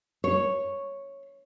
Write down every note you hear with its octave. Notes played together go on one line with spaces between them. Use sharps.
C#5